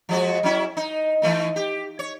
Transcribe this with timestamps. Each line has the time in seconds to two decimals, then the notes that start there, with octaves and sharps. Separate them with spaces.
0.09 F3 G#3 F#4
0.43 F#3 C#4 E4
0.77 D#4
1.22 E3 A3 D#4
1.56 G4
1.99 C#5